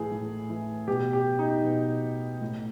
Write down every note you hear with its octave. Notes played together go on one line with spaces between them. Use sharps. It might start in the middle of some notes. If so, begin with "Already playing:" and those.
Already playing: A2 E3 G#4
A2
E3
B2 G4
G4
D#4
B2
A2